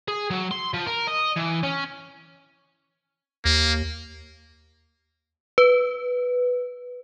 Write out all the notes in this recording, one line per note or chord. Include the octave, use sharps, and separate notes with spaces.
G#4
F#3
C6
F3
A#4
D#5
E3
C#4
D#2 A#3
B4